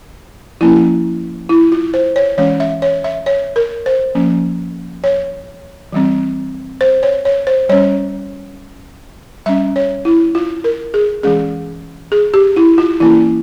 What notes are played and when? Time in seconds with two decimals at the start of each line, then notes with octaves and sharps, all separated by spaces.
0.61 F3 A#3 C#4 E4
1.49 E4
1.72 F4
1.94 C5
2.16 C#5
2.38 E3 G#3 C#4 C#5
2.60 E5
2.82 C#5
3.04 E5
3.26 C#5
3.56 A#4
3.86 C5
4.15 F3 A#3 C#4
5.04 C#5
5.93 E3 G3 C4
6.81 C5
7.03 C#5
7.25 C#5
7.47 C5
7.69 G3 C#4 C#5
9.46 G3 C#4 E5
9.76 C#5
10.05 E4
10.35 F4
10.64 A#4
10.94 G#4
11.23 E3 G#3 C#4 G#4
12.12 G#4
12.34 G4
12.56 E4
12.78 F4
13.00 E3 A#3 C#4 E4